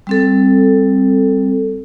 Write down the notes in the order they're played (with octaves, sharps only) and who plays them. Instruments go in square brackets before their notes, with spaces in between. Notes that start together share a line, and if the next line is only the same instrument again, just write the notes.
[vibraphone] G3 C4 A4